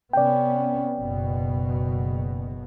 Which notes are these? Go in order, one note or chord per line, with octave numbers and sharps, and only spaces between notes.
C3 B3 C#4 D5 G5
F#1 B2